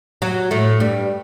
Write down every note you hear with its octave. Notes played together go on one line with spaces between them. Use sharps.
F#3 F#4
A2 A3
G2 G3